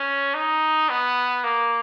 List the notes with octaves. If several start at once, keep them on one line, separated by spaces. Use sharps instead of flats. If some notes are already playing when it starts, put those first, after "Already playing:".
Already playing: C#4
D#4
B3
A#3